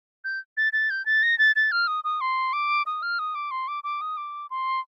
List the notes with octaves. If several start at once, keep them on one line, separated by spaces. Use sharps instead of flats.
G6
A6
A6
G6
A6
A#6
A6
A6
F6
D#6
D#6
C6
D6
D#6
F6
D#6
D6
C6
D6
D6
D#6
D6
C6